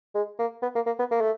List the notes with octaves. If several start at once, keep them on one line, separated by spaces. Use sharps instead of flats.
G#3
A#3
B3
A#3
A#3
B3
A#3
A3